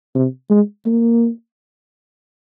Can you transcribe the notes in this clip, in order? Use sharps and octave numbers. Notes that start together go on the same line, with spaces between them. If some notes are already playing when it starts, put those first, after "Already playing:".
C3
G#3
A#3